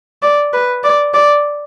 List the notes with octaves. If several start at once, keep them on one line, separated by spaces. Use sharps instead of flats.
D5
B4
D5
D5